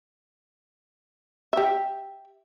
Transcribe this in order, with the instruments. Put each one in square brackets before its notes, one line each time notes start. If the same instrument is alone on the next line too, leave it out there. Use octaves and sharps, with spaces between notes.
[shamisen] G4 E5